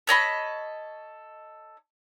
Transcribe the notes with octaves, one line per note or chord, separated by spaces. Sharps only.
A4 C#5 D#5 B5